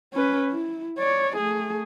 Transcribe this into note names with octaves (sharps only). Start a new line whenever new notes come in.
C#4 B4
E4
C#5 D5
A3 G#4